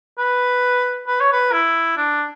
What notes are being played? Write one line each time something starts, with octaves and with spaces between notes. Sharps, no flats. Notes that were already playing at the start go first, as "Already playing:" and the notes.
B4
B4
C#5
B4
E4
D4